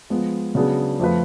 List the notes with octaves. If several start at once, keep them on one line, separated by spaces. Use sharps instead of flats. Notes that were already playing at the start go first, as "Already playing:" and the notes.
F3 G#3 B3 F4
C#3 F#3 B3 D4 G#4
F2 F3 A3 F4 B4